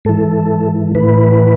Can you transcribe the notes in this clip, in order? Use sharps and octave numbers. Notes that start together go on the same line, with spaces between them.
G#2 E3 A4
A2 E3 B4